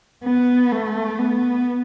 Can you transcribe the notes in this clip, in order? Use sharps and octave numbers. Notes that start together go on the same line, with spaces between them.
B3
A3
B3